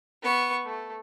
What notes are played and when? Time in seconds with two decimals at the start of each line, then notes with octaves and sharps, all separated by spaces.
0.23 B3 C#6
0.65 A3